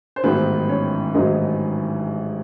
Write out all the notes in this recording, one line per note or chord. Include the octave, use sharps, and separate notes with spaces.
C5
A1 G#2 D#3 F#3 B3 B4
C#4 C#5
A1 G#2 D#3 F#3 D#4 D#5